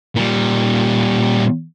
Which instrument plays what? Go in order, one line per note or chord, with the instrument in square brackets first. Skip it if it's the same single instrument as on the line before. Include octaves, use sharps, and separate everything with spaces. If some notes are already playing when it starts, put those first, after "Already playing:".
[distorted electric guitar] A#2 G3